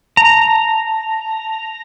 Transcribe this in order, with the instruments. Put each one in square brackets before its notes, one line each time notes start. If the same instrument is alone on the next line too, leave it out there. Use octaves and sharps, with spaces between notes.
[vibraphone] A5 [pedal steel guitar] A#5